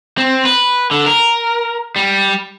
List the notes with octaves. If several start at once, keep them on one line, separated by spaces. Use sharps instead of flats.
C4
B4
D3
A#4
G3